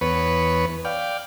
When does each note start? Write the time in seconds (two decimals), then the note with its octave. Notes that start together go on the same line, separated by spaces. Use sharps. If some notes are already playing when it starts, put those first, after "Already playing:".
0.01 E2 B3 B4 C#5
0.85 D5 F5 G5